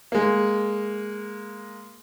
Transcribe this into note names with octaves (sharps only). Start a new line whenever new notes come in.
G#3 A#3